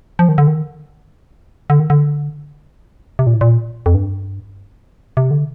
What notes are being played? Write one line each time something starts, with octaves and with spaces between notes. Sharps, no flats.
F3
D#3
D3
D#3
D3
D#3
D3
C3
A#2
A2
A#2
F2
G2
C3
D3